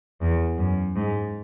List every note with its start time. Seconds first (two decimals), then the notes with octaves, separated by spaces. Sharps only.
0.21 E2
0.58 F#2
0.95 G#2